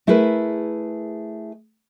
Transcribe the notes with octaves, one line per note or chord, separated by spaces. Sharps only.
A3 E4 G#4 A#4 B4